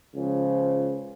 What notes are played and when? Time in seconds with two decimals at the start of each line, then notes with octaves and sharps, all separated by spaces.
0.13 C#2 C#3 F3